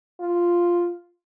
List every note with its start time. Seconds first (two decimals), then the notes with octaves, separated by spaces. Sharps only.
0.20 F4